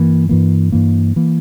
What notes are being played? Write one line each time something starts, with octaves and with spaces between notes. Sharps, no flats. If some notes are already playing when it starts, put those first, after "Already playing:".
Already playing: G2 E3 A#3
G2 E3 A#3
G2 E3 A#3
E3 A#3